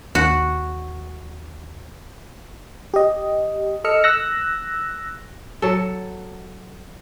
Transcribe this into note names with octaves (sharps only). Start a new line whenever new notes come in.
D#2 F#4
G4 D#5
A4 D#5 E6 F6 C#7
E6 F#6 A#6
F#3 A4